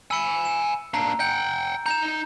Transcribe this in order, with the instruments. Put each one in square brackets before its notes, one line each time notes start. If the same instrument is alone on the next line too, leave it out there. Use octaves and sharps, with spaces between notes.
[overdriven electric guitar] G#5 B5 [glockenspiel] E6 C#7
[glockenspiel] E7
[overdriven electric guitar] A#3 D4 [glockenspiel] A#5
[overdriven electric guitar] F#5 G5 [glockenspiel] G6
[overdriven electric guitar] D#4 A#5 [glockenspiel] G6 E7